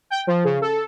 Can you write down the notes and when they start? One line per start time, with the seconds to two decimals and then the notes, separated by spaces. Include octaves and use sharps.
0.10 G5
0.27 F3
0.44 C#3
0.61 A4